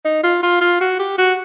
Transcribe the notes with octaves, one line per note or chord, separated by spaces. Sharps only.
D#4
F4
F4
F4
F#4
G4
F#4